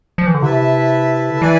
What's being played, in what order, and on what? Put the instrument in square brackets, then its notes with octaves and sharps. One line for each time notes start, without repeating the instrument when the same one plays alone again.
[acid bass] F3
E3
D3
[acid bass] C3 [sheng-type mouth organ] E4 B4 E5 A5
[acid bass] D3
[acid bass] E3 [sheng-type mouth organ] E4 B4 D5 G#5